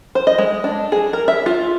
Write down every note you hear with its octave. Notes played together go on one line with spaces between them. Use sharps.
C5
D#5
G#3
D4
G#4
A#4
E5
F4